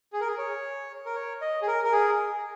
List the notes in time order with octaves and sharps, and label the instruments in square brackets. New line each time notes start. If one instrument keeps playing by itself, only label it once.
[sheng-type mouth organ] G#4
A#4
G#4
C#5
A#4
C#5
D#5
G#4
A#4
A#4
G#4